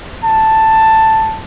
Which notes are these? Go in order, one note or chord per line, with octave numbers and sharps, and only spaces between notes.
A5